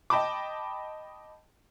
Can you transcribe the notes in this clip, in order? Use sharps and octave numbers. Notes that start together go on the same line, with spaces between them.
D#5 G5 A5 B5 D6